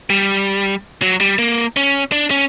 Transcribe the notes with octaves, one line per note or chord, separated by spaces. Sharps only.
G3
F#3
G3
A#3
C#4
D4
C#4